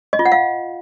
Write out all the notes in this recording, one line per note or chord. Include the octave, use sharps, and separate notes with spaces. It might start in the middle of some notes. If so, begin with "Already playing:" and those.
D#5
F4
F#5
F5